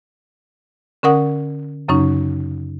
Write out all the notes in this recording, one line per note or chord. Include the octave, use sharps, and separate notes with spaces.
D3 C#4 A#4 F#5 D#6
F#2 C#3 F#3 C#4 D#4